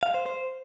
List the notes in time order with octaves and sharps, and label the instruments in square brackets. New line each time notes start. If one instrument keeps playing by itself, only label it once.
[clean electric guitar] F5
C5
C5